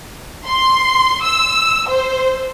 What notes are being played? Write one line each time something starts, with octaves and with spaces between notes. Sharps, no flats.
C6
E6
C5